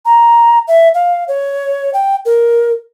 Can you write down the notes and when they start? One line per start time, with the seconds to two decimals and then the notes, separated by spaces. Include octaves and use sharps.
0.05 A#5
0.68 E5
0.94 F5
1.28 C#5
1.94 G5
2.26 A#4